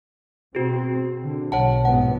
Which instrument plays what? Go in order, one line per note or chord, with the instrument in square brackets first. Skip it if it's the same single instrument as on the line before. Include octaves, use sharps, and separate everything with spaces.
[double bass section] B2 C4 [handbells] F#4 G#4
[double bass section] D3
[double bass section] B1 [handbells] C#5 F#5 A5
[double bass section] A#1 G#2 B3 [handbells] F#5